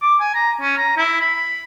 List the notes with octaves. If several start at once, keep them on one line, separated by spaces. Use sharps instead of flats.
D6
G#5
A#5
C#4
A#5
E4
B5